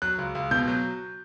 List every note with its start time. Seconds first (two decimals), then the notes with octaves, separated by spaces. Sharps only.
0.02 F#3 F#6
0.18 C#2
0.35 C#2
0.51 B2 G6
0.68 F#3